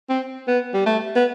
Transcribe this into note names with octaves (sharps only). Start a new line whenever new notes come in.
C4
B3
G3
A3
B3